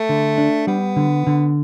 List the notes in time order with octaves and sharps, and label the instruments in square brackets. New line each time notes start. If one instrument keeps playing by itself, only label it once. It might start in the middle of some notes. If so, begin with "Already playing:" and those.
Already playing: [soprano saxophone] A3
[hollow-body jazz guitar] D3
D4
[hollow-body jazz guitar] G3 [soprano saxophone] B3
[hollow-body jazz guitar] D3
D3